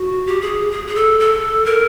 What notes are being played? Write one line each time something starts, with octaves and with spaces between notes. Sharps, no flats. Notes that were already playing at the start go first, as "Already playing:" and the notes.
Already playing: F#4
G4
G#4
G#4
G#4
A4
A4
A#4